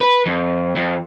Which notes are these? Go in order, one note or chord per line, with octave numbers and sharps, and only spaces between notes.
B4
F2
F2